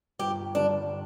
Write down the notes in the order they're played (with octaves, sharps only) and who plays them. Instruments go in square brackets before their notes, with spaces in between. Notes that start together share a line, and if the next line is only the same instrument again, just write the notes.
[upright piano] G1 [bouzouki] G4
[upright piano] G2 D3 G3 [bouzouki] D4